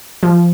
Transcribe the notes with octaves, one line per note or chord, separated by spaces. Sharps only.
F3